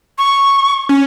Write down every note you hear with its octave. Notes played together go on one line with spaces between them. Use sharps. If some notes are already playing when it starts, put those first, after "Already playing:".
C#6
C#4